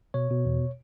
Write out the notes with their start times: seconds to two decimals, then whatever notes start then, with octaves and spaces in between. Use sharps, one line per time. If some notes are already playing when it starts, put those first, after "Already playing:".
0.14 B2 C#5
0.30 B2
0.45 E2